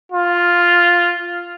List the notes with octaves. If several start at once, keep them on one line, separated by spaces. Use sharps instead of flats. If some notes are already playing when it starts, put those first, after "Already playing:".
F4